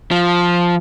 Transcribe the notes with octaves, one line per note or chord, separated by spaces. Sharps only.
F3